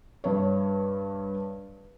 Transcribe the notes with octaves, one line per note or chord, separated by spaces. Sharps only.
G2 C#5